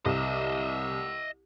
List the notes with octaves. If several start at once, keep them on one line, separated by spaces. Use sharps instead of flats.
C2 D#5 E5